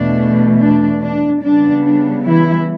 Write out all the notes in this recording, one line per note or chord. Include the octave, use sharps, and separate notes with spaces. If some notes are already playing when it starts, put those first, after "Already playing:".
Already playing: E2 B2 A3 D4
D4
D4
C#3 G3 B3 D4
D4
E3 E4